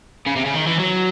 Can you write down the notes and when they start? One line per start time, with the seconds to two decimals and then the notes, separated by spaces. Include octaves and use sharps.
0.27 C#3
0.36 C3
0.46 C#3
0.54 D#3
0.67 E3
0.80 F#3